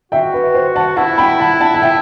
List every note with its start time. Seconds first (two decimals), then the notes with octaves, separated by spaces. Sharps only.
0.12 F#4 E5 G5
0.34 B4
0.54 C5
0.76 F#5 A5
0.97 E4 F#5 A5
1.18 G5 B5
1.39 F#5 A5
1.60 F#5 A5
1.74 A5
1.81 E5 G5